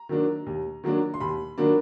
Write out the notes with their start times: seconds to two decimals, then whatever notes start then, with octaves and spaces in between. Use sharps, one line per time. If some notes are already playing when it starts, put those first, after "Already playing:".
Already playing: A#5
0.09 D#3 F#3 A#3 D4
0.46 D#2
0.84 D#3 F#3 A#3 D4
1.14 C6
1.20 D#2 B5
1.58 D#3 F#3 A#3 D4